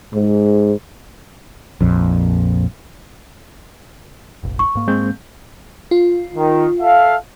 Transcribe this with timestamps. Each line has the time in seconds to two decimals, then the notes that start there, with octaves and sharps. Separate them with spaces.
0.13 G#2
1.81 A#1 F2
4.43 F1 A#1
4.59 C#6
4.75 G#2 A#3
4.88 G#3 C4 G6
5.91 F4
6.35 D#3
6.80 A4 E5 F5